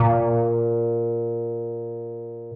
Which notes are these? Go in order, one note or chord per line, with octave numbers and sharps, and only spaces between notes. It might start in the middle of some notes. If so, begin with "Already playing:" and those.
Already playing: A#2